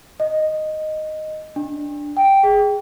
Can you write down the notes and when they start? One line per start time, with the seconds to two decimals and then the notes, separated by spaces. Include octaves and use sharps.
0.20 D#5
1.56 D4
2.17 G5
2.43 G#4